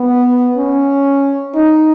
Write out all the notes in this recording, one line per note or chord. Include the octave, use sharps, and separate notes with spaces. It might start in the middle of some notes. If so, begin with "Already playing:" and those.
Already playing: B3
C#4
D#4